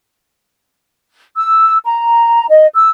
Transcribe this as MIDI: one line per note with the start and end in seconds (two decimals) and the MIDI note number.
1.36 1.77 88
1.84 2.46 82
2.49 2.66 75
2.74 2.89 88